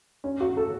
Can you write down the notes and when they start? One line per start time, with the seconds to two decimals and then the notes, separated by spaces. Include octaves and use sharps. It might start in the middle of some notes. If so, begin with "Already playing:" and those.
0.24 C#4
0.40 F#4
0.57 A4